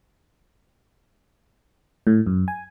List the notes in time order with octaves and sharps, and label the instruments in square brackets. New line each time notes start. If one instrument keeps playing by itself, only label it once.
[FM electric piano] A2
F#2
G#5